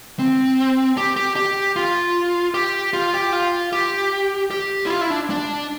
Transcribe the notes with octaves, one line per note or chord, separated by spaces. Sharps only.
C4
G4
G4
G4
F4
G4
F4
G4
F4
G4
G4
E4
F4
E4
D4
D4